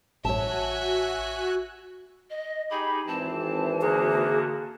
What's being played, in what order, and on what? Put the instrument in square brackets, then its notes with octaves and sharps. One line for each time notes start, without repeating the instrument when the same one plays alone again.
[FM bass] A1 [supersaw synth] F#4 G#5 F#6 [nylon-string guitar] C#5 A5 [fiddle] E5
[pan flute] D#5
[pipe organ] D#4 G4 G#4 [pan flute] B5
[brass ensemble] G#1 E3 [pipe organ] C4 [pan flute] A5
[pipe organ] D3 A#3 F#4 [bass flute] G#4